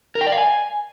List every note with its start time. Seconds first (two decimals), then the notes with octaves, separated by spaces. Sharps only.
0.15 A#4
0.21 G5
0.27 D5
0.32 F5
0.38 G#5